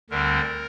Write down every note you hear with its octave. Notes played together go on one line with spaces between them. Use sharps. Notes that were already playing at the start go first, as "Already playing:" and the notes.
D2 D3 G3 C4 A#4